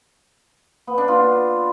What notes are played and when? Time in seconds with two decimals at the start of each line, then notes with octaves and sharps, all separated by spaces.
0.87 B3
0.98 D4
1.08 F4